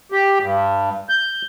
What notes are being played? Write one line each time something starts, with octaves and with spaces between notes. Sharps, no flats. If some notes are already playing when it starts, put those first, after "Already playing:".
G4
G2
G6